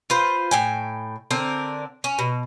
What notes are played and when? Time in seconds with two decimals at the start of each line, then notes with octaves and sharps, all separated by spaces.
0.10 F4 B4 C5
0.51 A2 G5 G#5
1.31 D3 C4 D4 A#4
2.04 C#4
2.19 B2